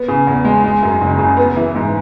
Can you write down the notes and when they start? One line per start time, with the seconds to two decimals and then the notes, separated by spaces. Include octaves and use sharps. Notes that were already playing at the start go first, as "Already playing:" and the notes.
Already playing: B3
0.08 C#3
0.27 E2
0.45 G#3
0.64 G#3
0.83 F#2
1.01 F#1
1.18 C#3
1.37 B3
1.56 E3
1.75 G#2